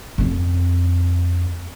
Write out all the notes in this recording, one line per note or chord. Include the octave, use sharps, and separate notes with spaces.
F2 C4